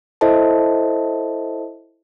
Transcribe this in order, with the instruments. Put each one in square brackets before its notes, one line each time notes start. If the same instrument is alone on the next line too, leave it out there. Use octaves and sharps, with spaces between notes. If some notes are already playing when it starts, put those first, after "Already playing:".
[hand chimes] E4 A4 C5 D#5 E5 A5